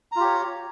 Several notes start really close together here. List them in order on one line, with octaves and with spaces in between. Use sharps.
A#5 F4 G4 C#5